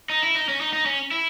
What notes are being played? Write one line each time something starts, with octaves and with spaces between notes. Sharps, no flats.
D#4
E4
D#4
C#4
D#4
D#4
C#4
E4